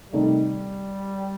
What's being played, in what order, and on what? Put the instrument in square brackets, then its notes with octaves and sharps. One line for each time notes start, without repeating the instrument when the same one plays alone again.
[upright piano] C3 D#3 A3 D#4 [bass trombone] G3